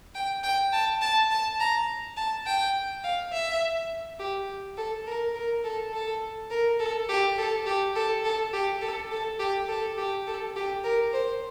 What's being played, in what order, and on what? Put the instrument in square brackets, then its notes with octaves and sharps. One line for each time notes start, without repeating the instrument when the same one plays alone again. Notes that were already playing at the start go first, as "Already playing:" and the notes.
[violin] G5
G5
A5
A5
A5
A#5
A5
G5
F5
E5
G4
A4
A#4
A#4
A4
A4
A#4
A4
G4
A4
G4
A4
A4
G4
A4
A4
G4
A4
G4
A4
G4
A#4
C5